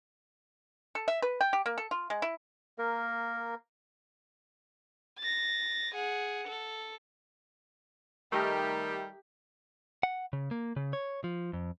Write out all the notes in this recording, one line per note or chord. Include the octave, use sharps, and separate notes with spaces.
A4
E5
B4
G5
G4
A#3
A4
F4
G#3
E4
A#3 A#4
A6 A#6
G#4 F#5
A4
D#3 G3 A3 D#4 G4 A#4
F#5
C#3
A#3
C#3
C#5
F3
F2